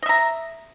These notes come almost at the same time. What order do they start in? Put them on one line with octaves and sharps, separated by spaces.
D#5 E5 A#5